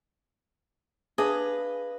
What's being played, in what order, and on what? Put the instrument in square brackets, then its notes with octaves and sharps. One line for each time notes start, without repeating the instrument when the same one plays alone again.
[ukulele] D4 G#4 [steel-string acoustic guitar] B4 D#5 F5